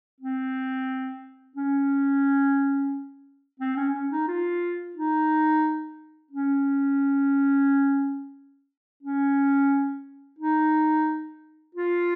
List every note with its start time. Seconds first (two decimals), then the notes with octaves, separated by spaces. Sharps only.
0.21 C4
1.56 C#4
3.60 C4
3.77 C#4
3.94 C#4
4.11 D#4
4.28 F4
4.96 D#4
6.31 C#4
9.03 C#4
10.39 D#4
11.75 F4